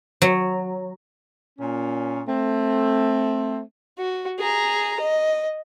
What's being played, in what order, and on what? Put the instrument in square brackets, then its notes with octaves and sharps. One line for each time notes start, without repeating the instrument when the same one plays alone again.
[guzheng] F#3
[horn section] A#2 C#4
A3 C4
[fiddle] F#4
G#4 A#5
D#5